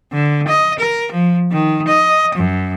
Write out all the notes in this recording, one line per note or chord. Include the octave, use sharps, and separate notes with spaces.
D3
D#5
A#4
F3
D#3
D#5
F#2